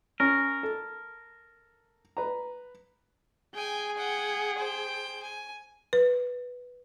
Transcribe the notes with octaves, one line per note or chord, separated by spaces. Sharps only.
C#4 A#4
A4
B4 A#5
G#4 G5 G#5
F#5 G5
C5 G5
G#5
B4